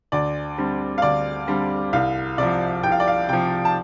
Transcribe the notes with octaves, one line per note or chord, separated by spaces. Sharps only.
D2 D5
D3 G3 C4
F5
D2 D5
D3 G3 C4
C2 F5
C3 F3 D5
C2 G5
F5
D5
F5
C3 F3 G5
A5